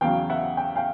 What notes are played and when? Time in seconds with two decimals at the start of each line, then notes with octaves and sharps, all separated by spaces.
0.01 E2 C#3 F#3 F5 G5
0.30 E5 F#5
0.57 G5
0.76 F5 G5